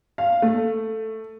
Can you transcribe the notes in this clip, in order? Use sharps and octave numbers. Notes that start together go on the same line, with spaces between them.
F5
A3